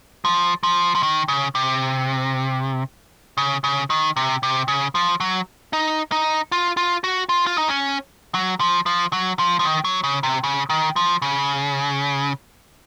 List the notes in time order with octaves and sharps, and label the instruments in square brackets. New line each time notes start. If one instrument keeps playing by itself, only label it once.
[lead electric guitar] F3
F3
F3
D#3
C#3
C3
C#3
C#3
D#3
C3
C3
C#3
F3
F#3
D#4
D#4
F4
F4
F#4
F4
F4
D#4
C#4
F#3
F3
F3
F#3
F3
F3
D#3
F#3
C#3
C3
C#3
D#3
F3
C#3